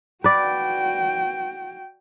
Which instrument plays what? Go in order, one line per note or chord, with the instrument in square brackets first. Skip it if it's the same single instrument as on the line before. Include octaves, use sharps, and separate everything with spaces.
[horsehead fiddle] F#4 G5 [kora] B4 D5